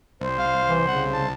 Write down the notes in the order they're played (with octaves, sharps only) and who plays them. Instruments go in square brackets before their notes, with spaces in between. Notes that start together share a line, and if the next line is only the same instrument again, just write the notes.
[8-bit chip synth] C2 [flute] C5
[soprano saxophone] F5
[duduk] E3
[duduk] C#3 [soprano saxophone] F#5
[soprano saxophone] A5